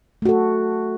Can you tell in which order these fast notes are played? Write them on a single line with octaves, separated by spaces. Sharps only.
A3 F#4 A4